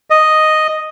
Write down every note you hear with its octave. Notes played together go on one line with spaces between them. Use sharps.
D#5